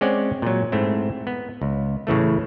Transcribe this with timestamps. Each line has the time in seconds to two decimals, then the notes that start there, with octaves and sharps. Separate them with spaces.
0.01 G#3 C4 C#4 D5 F#5
0.42 A#2 F#3
0.72 G#2 A3 C4 E4
1.27 B3
1.62 C#2
2.07 A2 C#3 E3 A3